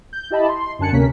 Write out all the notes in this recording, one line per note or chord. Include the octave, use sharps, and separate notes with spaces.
G6
E4 G4 D#5 A5 B5
C6
F#2 D3 G#5 A5 F#6 C#7
D2 C3 A#3 C#4 A#4 B6